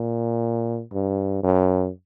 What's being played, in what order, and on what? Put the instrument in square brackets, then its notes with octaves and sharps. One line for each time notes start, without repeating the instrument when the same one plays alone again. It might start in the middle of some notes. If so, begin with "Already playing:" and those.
Already playing: [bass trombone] A#2
G2
F#2